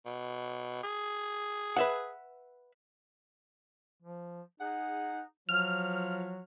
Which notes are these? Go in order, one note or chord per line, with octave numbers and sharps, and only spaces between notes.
B2
G#4
B4 E5 F#5
F3
D#4 G#4 F#5
F3 F#3 F6